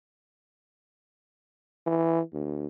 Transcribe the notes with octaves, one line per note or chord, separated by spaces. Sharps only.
E3
D2